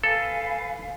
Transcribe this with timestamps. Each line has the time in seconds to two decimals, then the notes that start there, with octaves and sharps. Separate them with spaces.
0.04 A4 B4 F5 G#5